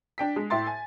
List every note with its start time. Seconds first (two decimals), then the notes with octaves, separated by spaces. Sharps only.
0.18 D4 G5 B6
0.36 G#3
0.50 A2 E5 G5 C6 A6
0.67 G#5